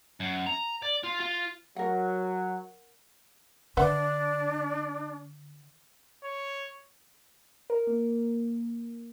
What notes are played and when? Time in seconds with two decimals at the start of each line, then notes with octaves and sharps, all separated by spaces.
0.20 F#2
0.47 A#5
0.83 D5
1.04 F4
1.20 F4
1.76 F#3 A#4 F#5
3.77 D3 D4 B4 E5 F#5
6.24 C#5
7.70 A#4
7.87 A#3